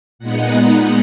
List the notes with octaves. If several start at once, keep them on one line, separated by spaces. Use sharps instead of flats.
A#2 G#3 B3 D#4 F#5